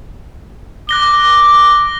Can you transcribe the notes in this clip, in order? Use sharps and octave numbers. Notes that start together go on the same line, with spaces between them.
D6 F#6 A#6 G7